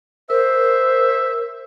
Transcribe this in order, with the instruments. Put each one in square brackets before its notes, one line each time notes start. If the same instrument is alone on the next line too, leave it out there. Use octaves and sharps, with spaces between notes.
[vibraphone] A#4 [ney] C5 [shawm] E5